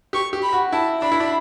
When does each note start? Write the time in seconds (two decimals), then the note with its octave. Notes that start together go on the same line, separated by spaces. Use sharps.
0.13 G4 C#6
0.33 G4
0.43 B5
0.53 F#4
0.72 E4 A5
1.02 D4 B5
1.12 E4
1.20 D4